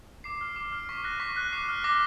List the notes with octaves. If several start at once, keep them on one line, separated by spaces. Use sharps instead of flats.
D6 C7
F6
D6
F6
C#6 B6
F#6 A#6
C#6 B6
F#6
D6 C7
F6
D6 A#6